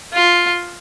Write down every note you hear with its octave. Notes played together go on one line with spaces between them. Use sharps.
F4